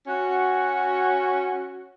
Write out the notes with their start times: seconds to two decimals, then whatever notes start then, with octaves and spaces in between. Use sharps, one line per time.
0.07 C#4 F#4